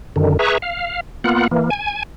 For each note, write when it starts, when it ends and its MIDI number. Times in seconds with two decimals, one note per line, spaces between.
0.16 0.37 42
0.16 0.37 50
0.16 0.37 51
0.39 0.58 68
0.39 0.58 71
0.39 0.58 76
0.39 0.58 82
0.39 0.58 85
0.62 1.00 77
1.24 1.47 58
1.24 1.47 59
1.24 1.47 65
1.24 1.47 78
1.51 1.70 52
1.51 1.70 58
1.70 2.03 80